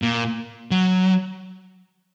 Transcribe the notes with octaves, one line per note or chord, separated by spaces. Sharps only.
A#2
F#3